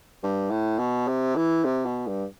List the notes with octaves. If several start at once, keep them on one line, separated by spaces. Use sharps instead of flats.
G2
A2
B2
C3
E3
C3
B2
G2